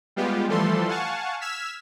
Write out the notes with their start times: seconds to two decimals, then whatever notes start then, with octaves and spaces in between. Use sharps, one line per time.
0.16 G3 G#3 B3 F4 G4
0.48 E3 F3 G3 A3 A4 C6
0.88 F5 F#5 G#5 A5 C#6
1.41 E6 F6 G#6 B6 E7